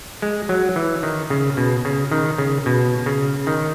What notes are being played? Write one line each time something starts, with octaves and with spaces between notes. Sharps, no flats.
G#3
F#3
E3
D#3
C#3
B2
C#3
D#3
C#3
B2
C#3
D#3